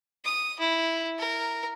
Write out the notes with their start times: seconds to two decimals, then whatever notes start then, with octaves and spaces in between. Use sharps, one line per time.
0.25 D#6
0.60 E4
1.19 A#4